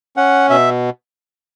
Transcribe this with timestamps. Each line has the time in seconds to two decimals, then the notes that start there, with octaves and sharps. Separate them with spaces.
0.17 C#4 F#5
0.50 B2 E5